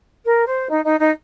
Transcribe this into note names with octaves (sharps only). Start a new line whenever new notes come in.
A#4
C5
D#4
D#4
D#4